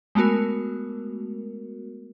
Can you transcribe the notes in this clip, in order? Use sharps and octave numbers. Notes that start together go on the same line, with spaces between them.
G#3 A3 B3 F#4 A#4